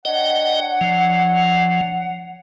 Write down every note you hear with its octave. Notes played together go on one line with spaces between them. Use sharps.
D4 C#5 D#5 F#5 G5
F3